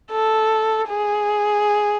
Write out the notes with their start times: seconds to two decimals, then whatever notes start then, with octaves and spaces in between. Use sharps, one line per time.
0.12 A4
0.89 G#4